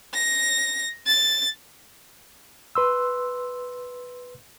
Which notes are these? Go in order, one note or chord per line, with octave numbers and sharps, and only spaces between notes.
A#6
A6
B4 C6 E6